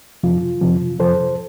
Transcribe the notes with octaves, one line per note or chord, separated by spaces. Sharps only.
F2 C3 F3 F4
F2 C3 F3
F2 C3 F3 A4 C5